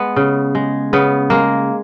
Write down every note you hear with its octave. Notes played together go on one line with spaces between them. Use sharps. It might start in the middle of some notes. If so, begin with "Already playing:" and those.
Already playing: G#3 B3
C#3
G#3
C#3 B3
G#3 A#3